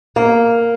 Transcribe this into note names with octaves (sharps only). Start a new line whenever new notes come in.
A#3